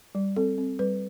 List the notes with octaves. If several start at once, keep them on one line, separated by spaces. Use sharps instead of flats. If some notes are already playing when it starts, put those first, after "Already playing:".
G3
C4 A4
C4
G3 B4